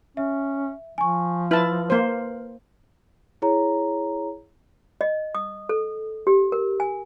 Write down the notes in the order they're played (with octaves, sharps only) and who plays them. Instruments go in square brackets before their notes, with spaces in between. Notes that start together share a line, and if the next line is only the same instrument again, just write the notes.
[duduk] C#4 [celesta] E5
[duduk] F3 [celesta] G#5 C#6
[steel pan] E4 A5 [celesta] B4 F6 F#7
[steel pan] A#3 C5
[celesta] E4 G#4 C#5 A#5
[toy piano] D#5
D#6
A4
G4
A#4
G#5